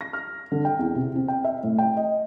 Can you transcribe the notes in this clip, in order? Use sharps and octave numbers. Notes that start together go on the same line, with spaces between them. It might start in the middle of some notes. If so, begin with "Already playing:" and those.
A#6
F6
D3
G5
E2
C3
C4
G5
E5
A2
G5
D#5